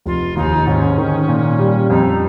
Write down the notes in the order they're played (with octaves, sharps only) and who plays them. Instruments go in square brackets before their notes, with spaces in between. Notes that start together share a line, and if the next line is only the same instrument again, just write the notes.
[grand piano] F1 [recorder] F4
[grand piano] D#2 [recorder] D#4
[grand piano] G#2 [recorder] C#4
[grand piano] D#3
A#2
G3
[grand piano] F2 [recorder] D#4